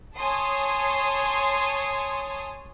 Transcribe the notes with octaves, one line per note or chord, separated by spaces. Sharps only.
C#5 G#5 A5 C6 D#6